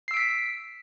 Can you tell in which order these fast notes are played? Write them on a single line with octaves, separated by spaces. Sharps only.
C7 E6 D7 B6